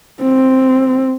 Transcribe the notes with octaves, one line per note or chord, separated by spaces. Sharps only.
C4